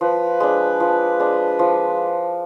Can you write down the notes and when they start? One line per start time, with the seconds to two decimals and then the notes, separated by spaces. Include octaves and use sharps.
0.01 F3 B4
0.40 G#3 D4
0.80 F3
1.19 G#3 D4
1.59 F3